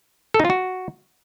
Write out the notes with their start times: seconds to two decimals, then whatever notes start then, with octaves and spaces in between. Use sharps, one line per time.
0.34 A4
0.40 D#4
0.45 F4
0.50 F#4